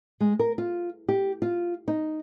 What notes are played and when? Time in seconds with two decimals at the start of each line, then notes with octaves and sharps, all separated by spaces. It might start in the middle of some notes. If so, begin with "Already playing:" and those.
0.20 G#3
0.39 A#4
0.58 F4
1.09 G4
1.42 F4
1.88 D#4